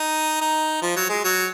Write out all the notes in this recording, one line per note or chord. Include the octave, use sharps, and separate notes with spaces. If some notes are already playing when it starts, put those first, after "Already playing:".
Already playing: D#4
D#4
F3
F#3
G#3
F#3